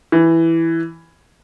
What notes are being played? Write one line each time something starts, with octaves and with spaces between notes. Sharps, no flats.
E3